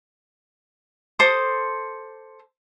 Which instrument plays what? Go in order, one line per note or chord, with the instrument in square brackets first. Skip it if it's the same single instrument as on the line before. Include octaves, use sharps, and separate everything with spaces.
[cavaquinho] A4 C5 D6 D#6